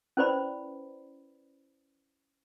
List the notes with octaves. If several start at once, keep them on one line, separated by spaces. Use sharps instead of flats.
C#4 E4 B4 C5 D5 B5